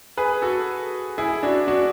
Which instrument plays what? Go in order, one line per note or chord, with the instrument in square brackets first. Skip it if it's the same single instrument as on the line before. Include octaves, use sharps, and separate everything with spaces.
[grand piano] G#4 B4
F#4 A4
E4 G#4
D4 F#4
D4 F#4